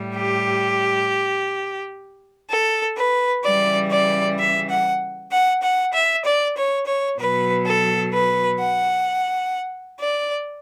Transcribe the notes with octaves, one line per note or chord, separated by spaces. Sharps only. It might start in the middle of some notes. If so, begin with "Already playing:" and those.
Already playing: A2 G3
G4
A4
B4
C#3 E3 G3 D5
D5
E5
F#5
F#5
F#5
E5
D5
C#5
C#5
B2 F#3 B4
A4
B4
F#5
D5